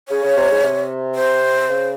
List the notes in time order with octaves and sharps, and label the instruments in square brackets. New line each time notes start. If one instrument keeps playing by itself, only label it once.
[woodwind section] C#3 [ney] C#5
[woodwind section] C#3
C3
G#2
C3
[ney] C5
[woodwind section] C#3